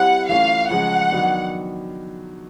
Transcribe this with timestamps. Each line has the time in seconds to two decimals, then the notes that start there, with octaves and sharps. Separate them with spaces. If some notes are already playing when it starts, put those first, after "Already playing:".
Already playing: G3 C4 E4 G4 F#5
0.29 E3 A3 C#4 F4 F5
0.70 C#3 F3 G#3 F#5
1.11 D#3 F#3 B3 D4